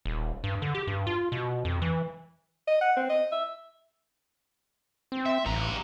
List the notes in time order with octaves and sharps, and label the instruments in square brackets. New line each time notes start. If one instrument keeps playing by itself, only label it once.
[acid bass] D#1
G2
D3
G4
G2
F4
B2
F2
E3
[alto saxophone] D#5
F#5
C4
D#5
E5
[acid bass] C4
[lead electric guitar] E5
[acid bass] A1 [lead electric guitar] G3 A#5